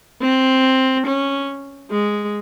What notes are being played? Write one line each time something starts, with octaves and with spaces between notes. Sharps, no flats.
C4
C#4
G#3